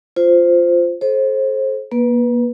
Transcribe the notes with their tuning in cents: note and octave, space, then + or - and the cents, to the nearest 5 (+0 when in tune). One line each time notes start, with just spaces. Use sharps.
F4 +0 C5 -10
A4 -35 C5 +25
A#3 +35 B4 -10